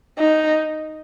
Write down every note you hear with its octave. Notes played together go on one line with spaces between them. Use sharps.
D#4